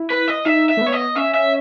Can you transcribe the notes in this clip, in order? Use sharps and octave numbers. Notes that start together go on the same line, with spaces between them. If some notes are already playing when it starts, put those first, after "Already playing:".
Already playing: E4
B4
D#5
D#4 E5
E5
A3
B3
C#5
D#5
C#4 E5
E5